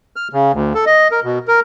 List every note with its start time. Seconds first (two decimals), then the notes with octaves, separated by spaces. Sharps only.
0.16 F6
0.33 C#3
0.53 D2
0.74 A4
0.86 D#5
1.11 A#4
1.24 B2
1.48 A#4